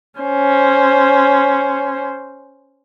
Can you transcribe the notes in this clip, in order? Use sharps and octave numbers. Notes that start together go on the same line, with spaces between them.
C#4 C5